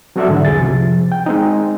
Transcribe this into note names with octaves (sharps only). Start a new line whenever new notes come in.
F#3 C4 F#4 A4 D5 E5
G#2 D3 E3
C2 F2 G#4 A6
C3 F3
G5
G#3 C4 D#4